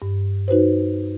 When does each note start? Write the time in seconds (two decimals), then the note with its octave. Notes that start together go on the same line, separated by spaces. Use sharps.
0.02 G2
0.48 D#4 F#4 B4 C5